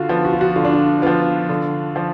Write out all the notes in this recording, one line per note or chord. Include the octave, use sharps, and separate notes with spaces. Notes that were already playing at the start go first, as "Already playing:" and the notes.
Already playing: D3 F4 F#4
F3 B3
F#4
F4
F#4
D3 F4
D4
F4
F3 B3 F4
D3
F3